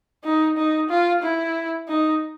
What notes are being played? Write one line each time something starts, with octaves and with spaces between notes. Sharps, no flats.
D#4
D#4
F4
E4
D#4